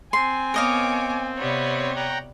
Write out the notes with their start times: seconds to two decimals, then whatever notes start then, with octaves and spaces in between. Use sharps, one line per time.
0.13 C4 G#5 C6
0.54 B3 A#4 C#5 D#5 F5 D6
1.37 C3 G3 B3 C#5
1.96 F#5 G5 A#5